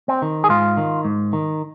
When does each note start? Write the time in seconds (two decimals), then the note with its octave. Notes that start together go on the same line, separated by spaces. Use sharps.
0.08 C4
0.22 D#3
0.44 G#4
0.49 G#2 F4
0.77 D#3
1.05 G#2
1.33 D#3